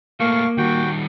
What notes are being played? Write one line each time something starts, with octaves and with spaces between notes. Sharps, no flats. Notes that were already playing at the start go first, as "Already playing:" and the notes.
A#2 A3 A#3 F5 C#6
D#3 G3 F#4 G5